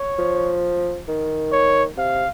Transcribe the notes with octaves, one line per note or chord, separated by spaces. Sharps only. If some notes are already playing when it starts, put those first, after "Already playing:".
Already playing: C#5
F3
D#3
C#5
C3 F5